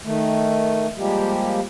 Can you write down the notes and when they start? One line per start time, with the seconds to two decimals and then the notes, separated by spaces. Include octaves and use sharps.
0.05 D#3 A3
0.98 F3 G3 G#3 A#3 G4